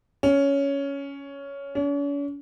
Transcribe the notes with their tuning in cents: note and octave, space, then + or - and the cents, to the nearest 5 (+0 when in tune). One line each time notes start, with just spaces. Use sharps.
C#4 +10
C#4 +45